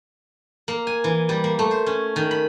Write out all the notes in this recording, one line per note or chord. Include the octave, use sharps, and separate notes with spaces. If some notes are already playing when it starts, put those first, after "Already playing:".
A#3
G#5
E3
G3
A#3
A3
C5
C#4
D#3
B5